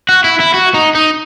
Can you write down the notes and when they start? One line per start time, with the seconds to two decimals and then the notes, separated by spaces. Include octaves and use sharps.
0.09 F#4
0.24 E4
0.40 E4
0.54 F#4
0.74 D#4
0.95 D#4